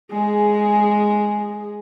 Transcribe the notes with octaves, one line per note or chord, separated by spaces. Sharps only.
G#3 G#4